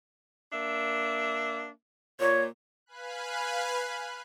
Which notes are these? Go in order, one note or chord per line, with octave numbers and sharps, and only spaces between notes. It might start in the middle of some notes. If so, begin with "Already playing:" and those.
A#3 D4 E5
A#2 C#5
B4 F5 G#5 B5 F#6